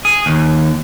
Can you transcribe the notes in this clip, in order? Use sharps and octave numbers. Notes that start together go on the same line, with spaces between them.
G#4
D#2